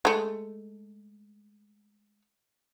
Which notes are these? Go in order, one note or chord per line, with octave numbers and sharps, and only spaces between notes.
G#3 A3